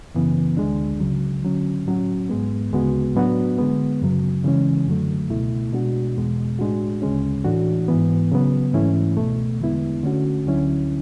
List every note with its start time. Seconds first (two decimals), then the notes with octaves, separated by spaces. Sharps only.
0.15 F#2 C#3 E3 B3
0.57 D2 D3 G#3 D4
1.00 C#2 C#3 F#3
1.43 D3 F#3 C#4
1.86 A2 F#3 C#4 F#4
2.30 G#2 G#3 B3
2.72 D2 C#3 G#3 B3 F#4
3.15 A2 F#3 B3 D4 F#4
3.58 D3 G#3 B3
4.02 F#2 C#3 F#3
4.44 C#3 E3 G#3 C#4
4.87 F#2 D3 F#3 A3
5.30 C#2 B2 A3 E4
5.73 B2 G#3 D4 F#4
6.16 E2 B2 G#3
6.59 A2 G#3 D4 F#4
7.02 D2 C#3 G#3 C#4
7.44 A2 E3 A3 D4 F#4
7.88 G#2 E3 B3
8.31 C#3 F#3 B3
8.73 G#2 E3 A3 C#4 E4
9.17 C#2 B2 A3
9.60 E2 D3 G#3 B3 E4
10.03 D3 A3 C#4 F#4
10.46 D2 D3 F#3 C#4 E4